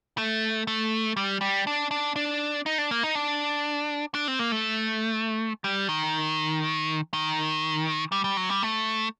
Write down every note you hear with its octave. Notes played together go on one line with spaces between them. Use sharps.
A3
A3
G3
G3
D4
D4
D4
D#4
D4
A#3
D#4
D4
D4
C4
A#3
A3
G3
D#3
D#3
G3
G3
F#3
G3
A3